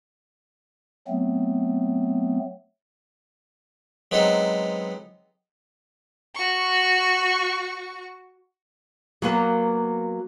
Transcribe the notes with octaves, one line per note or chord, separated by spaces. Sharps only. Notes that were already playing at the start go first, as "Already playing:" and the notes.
F#3 A3 B3 C4
F#3 G#3 B3 C4 D#4 A4
F#4 C#6
F#3 A#3 B3